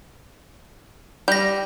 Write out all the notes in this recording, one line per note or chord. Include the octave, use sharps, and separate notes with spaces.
G3 G6 A#6